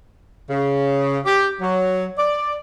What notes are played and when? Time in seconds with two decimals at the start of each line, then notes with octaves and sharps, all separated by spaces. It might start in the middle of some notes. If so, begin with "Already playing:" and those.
0.50 C#3
1.25 G4
1.61 F#3
2.18 D5